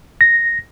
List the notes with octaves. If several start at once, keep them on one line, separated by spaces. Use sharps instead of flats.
A#6